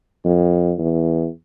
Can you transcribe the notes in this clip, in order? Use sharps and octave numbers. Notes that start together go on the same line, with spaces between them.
F2
E2